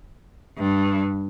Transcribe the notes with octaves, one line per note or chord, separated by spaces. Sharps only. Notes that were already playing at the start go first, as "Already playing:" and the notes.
G2